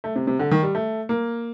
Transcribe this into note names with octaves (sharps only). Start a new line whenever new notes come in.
A3
C3
C3
D3
D#3
G3
A3
A#3